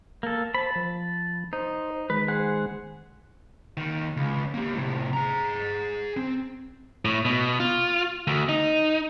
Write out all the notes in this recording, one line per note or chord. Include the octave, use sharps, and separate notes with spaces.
A#3 A4
C5 A5 B5
F3
D#4 C5
D#3 G#3 B4
G#4 C5 F#5
D#2 D#3
C#2
A#3 G4
A2 C3
G#4 A#5
C4
A2
B2
F4
D2
D#4